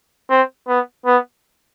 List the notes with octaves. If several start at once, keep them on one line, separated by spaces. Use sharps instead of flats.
C4
B3
B3